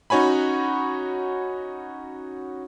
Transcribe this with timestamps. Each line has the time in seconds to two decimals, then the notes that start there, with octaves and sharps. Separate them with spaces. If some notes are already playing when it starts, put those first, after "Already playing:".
0.10 C#4 D#4 F#4 C#5 G#5 B5